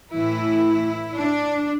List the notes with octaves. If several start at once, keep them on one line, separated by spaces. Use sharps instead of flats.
A2 E3 E4
D4